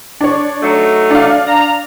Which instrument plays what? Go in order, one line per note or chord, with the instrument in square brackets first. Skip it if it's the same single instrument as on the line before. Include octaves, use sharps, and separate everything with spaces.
[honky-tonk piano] D4 C#5
[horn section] F#3 A3 D#4
[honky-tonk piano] D4 F5
[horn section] A#5